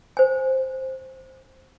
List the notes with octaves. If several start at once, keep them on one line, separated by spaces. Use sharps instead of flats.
C5 G#5